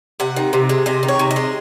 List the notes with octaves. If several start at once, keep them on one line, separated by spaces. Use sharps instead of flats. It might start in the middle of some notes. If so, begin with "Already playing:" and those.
C3 F#5
D#3
C3
G#3
C3 D#5
D#3
C#5
C3
D#5
G#3